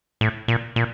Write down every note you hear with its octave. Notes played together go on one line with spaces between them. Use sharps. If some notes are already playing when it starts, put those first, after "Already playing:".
A2
A#2
A#2